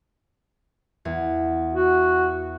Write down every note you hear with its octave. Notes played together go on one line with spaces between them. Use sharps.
E2
F#4